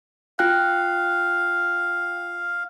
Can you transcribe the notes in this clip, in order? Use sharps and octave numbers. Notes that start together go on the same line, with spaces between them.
F4 F5 G5 F#6